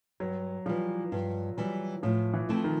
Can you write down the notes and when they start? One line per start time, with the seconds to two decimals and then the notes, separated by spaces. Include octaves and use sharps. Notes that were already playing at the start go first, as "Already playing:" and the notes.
0.20 G2 F#3
0.66 E3 F3 G3
1.12 G2 F3
1.57 E3 F#3 G3
2.03 A2 F3
2.33 E3
2.49 F3 A3 C4 E4
2.64 D#3